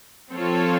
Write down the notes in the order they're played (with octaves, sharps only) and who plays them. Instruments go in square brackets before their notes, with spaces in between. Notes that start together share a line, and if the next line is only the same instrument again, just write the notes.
[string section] F3 C4 F4 A4 C#5